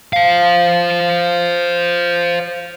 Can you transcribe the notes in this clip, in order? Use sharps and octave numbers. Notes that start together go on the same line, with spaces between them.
C5 F5